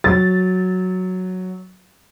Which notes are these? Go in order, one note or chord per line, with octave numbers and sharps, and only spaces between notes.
F#3 A6